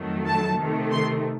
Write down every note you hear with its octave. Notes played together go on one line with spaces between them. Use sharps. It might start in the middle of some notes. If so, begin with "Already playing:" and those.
Already playing: F2 D#3 F#3 A3
A5
C3 D#3 A3
C6